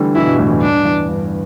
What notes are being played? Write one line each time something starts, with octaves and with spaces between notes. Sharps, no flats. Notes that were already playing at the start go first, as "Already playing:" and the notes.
Already playing: D3 E3 G3 A3
B2 E3 E4
G2 B2
E2 A2
E2
G2 D4
E2
G2